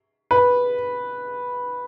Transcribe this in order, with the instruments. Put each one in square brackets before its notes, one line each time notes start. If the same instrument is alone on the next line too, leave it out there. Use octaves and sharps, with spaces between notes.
[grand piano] B4